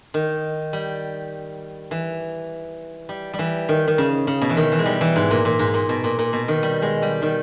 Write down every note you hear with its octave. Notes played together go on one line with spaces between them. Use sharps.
D#3
G3
E3
G3
G3
E3
D#3
D#3
C#3
C#3
B2
E3
D#3
E3
G#3
G3
E3
G#2
A#2
A#2
G#2
A#2
B2
A#2
A#2
B2
D#3
G3
G#3
G3
D#3